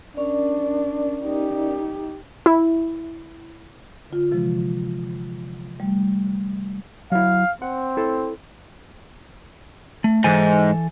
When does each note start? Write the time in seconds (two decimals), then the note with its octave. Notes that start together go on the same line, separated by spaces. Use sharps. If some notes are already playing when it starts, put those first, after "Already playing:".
0.17 C#4 D4 A#4 D5
1.23 D#4 G4
2.46 E4
4.10 D3 F4
4.31 C3 E3 F3 G#3
5.80 G3 A3
7.12 F#3 E4 F5
7.62 C4 F#5
7.97 E4 A4
10.04 A3
10.24 G#2 E3 A4 G#5